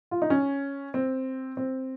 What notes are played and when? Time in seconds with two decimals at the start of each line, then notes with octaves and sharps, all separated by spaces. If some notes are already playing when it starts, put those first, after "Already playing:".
0.11 F4
0.22 D#4
0.30 C#4
0.94 C4
1.57 C4